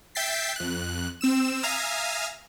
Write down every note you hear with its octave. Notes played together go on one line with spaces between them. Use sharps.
E5 G5 G6 A6 B6 C7
F2 F#6
C4 E6 E7
E5 F5 G#5 A#5 D#6 F6